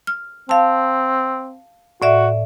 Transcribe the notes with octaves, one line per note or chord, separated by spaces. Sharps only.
F6
C4 F5 A5
A2 F#4 D5 E5